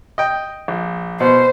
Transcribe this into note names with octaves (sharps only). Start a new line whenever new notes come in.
D#5 G5
A#1
B2 C5